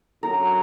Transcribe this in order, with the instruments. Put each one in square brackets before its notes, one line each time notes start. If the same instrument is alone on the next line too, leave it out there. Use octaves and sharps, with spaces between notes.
[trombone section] F#2 D3 F#3 [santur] A#4